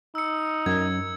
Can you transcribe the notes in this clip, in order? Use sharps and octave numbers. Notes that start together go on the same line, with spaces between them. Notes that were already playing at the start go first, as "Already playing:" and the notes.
D#4 E6 C#7
F#2 G#6